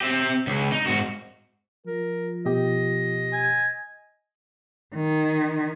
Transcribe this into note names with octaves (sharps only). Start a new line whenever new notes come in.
C4 G4
C#2
D#4
G#2 F#4
F3 A#4
B2 G4 D#5
G#5
D#3